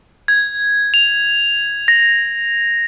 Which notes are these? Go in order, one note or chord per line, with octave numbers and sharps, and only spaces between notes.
G#6
F7
A#6